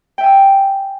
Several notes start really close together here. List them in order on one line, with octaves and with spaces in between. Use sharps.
G5 E5 G#5 E6